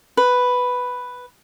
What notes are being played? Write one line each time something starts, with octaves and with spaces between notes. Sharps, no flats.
B4